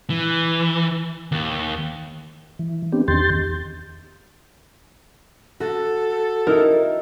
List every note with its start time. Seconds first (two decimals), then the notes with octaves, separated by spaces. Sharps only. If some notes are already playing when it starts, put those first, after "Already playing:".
0.10 E3
1.32 D#2
2.59 E3
2.92 B3 C4 D4 G4
3.08 E2 D#3 G4 C6 G6 A6
5.60 F#4 A4
6.47 D#4 E4 A#4